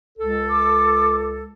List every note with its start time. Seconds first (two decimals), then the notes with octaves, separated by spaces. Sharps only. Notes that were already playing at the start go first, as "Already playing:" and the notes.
0.18 C#2 A4
0.50 D6